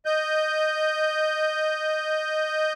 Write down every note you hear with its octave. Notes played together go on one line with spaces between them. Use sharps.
D#5 G6